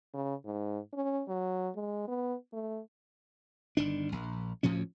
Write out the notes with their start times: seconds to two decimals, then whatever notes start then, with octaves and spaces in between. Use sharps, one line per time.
0.14 C#3
0.45 G#2
0.93 C#4
1.28 F#3
1.75 G#3
2.08 B3
2.53 A3
3.77 G1 D#3 D4
4.12 A#1
4.63 D2 A2 F3 C#4